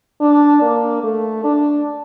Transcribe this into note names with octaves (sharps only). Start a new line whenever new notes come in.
D4
A#3
A3
D4